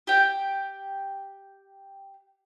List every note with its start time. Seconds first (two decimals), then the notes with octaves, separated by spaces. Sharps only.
0.07 G4 G5